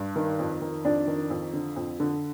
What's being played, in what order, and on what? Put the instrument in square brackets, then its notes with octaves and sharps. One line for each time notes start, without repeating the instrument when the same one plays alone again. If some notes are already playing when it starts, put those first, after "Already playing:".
Already playing: [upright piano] G2
D#3
F2
D#3
F2 D4 D5
D#3
F2
D3
F2
D3